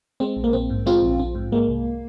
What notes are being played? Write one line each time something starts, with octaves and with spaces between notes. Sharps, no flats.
G#3 C4
A#1
A#3
A#1 C4
G#2
G#3 C4 F4
A#1
A#1 C4
G#2
G#3 A#3
C2